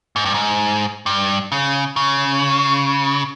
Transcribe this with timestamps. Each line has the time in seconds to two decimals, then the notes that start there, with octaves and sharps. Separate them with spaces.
0.16 G#2
0.25 G2
0.34 G#2
1.06 G2
1.52 C#3
1.96 C#3